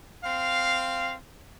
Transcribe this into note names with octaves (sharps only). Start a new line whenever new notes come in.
C4 F5